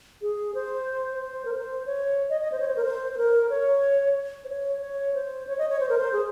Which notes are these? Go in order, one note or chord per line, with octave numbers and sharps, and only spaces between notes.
G#4
C5
C5
A#4
C5
C#5
D#5
D#5
C5
C#5
C5
A#4
C5
C5
A#4
C#5
C5
C#5
C#5
C5
C#5
D#5
C#5
C5
A#4
C5
G#4